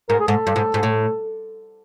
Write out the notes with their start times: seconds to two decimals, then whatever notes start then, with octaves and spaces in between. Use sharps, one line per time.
0.09 G#2 A#4
0.20 G#4
0.28 G#2 A4
0.47 G2
0.56 G#2
0.74 G#2
0.83 A2